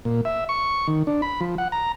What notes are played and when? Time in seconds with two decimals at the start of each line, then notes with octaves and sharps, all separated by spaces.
0.05 A#2
0.25 E5
0.49 C#6
0.88 D#3
1.07 D4
1.22 B5
1.41 F3
1.58 F#5
1.72 A#5